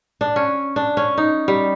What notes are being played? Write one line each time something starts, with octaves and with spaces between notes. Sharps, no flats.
D4
C#4
D4
C#4
D#4
G3